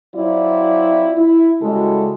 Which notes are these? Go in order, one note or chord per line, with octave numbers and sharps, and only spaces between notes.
F#3 C4 E4 F4 D5
E4
C#3 G3 G#3 E4 F#4 A4